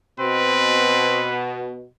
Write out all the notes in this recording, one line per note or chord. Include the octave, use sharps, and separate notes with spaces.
B2 C4 B4